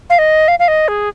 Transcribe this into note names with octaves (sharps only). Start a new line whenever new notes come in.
F5
D#5
F5
F5
D#5
G#4